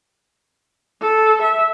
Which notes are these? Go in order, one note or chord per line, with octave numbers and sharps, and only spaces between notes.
A4
E5